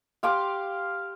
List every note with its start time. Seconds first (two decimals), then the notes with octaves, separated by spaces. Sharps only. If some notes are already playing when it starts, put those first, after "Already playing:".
0.23 G4 F5 C6 D6